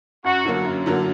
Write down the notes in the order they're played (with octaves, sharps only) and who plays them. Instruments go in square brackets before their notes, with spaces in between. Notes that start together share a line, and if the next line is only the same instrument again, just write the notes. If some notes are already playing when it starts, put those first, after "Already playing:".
[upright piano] F#2 [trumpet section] F#4
[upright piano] D3 F#3 A#3
F#2
D3 F#3 A#3